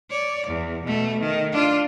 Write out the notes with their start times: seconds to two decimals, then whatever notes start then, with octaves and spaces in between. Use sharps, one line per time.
0.10 C#5 D5
0.47 E2
0.85 B2 A3
1.20 D#3
1.52 D4 F4